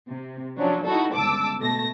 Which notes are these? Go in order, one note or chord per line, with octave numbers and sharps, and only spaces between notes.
C3
F3 F#3 C#4 D4
D#4 E4 F#4 A4
G1 C#2 A5 D6 E6
B2 A3 A5 A#6